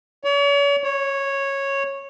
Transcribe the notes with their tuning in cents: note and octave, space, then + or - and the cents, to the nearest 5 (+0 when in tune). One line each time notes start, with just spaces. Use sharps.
C#5 +40
C#5 -10